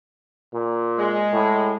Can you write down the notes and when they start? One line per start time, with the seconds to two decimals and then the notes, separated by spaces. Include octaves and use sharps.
0.54 A#2
0.99 G#3
1.32 A2